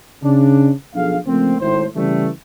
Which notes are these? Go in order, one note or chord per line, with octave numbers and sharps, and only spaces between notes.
C#3 D4
B1 F3 D4 G#4 A4 F5
C#3 F3 A3 A#3 C4
G#1 A2 C5
C#3 E3 G3 A3